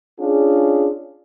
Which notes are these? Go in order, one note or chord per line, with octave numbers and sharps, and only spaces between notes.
C#4 D4 F4 G#4